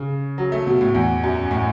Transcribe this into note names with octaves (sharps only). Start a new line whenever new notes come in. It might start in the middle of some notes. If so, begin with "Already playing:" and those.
Already playing: C#3
F#3
A3
B2
A2
E2
F#2
A2